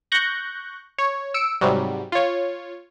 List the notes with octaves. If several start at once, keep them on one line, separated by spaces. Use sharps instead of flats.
C#6 F#6 G6 A#6
C#5
E6 C#7 D7
G#2 C3 F#3 G3
F4 C#5